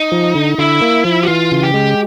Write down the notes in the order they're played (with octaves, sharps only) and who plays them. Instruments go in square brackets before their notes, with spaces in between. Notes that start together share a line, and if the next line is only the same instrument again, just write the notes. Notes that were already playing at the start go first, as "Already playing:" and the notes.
Already playing: [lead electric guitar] D#4
[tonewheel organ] F3
D3
[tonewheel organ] D3 [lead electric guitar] E4
[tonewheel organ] A#3
F3
[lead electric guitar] F#4
[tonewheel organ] E3 [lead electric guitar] F4
[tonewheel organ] C#3
[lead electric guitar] G4
[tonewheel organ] G#3